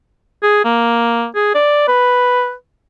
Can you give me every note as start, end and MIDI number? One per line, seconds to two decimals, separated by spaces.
0.43 0.61 68
0.65 1.26 58
1.35 1.55 68
1.55 1.86 74
1.88 2.53 71